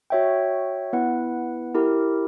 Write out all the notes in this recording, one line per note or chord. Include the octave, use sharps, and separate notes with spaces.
F#4 C#5 E5 G5
B3 E4 B4 F#5
E4 G4 A#4